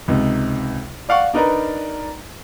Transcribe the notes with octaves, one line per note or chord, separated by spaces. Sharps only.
C#2 C3 D#4
D5 F5 F#5 C#6
D4 D#4 A#4 B4 D5 A#5